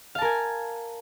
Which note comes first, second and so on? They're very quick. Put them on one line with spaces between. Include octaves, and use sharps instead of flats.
F5 A5 A#4 G#5